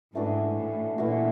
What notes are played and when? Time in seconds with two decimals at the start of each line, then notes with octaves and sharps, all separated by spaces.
0.15 G#2 E3 A3 D4 F#4
0.56 A2
0.98 A#2 E3 A3 D4 F#4